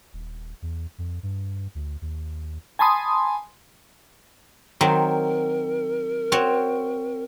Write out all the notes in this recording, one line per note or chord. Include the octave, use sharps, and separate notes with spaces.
D#1
E2
F2
G2
D2
D#2
G#5 A5 B5 C6 D#6
D#3 F#3 C4 A#4
C4 F#4 C#5